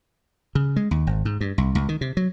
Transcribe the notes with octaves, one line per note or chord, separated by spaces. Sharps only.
C#3
G#3
D#2
G#1
G#2
G2
C2
C#2
D#3
C3
F#3